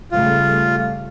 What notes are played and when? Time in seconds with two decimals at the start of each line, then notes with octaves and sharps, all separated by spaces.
0.12 C#3 G3 A3 F4